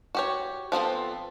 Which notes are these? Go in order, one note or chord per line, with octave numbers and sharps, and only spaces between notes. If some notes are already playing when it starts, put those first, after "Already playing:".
F#4 G4 C#5
F3 B3 C4 A4